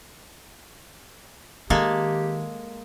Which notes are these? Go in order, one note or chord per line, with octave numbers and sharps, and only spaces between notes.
D#3 G#3 A#3 G4 A4